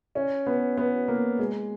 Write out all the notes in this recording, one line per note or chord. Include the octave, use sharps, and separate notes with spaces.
C#4
B3
B3
A#3
G#3